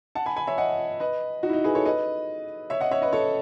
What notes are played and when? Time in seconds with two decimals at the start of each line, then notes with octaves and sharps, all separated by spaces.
0.15 F#5 A5
0.26 G#5 B5
0.36 G#5 B5
0.47 C#5 E5
0.58 D#5 F#5
1.00 B4 D#5
1.43 D#4 F#4
1.49 E4
1.53 D#4
1.64 G#4 B4
1.75 A4 C#5
1.85 B4 D#5
2.70 C#5 E5
2.80 D#5 F#5
2.91 C#5 E5
3.02 B4 D#5
3.13 A4 C#5